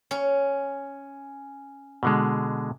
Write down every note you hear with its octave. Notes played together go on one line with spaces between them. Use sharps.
C#4
B2 D3 G#3